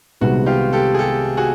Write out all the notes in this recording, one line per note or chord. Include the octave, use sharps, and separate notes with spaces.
C2 C3 D#3 G#3 B3 F#4
F4 G4
G4 A4
G#4
G4 A4
F#4 G#4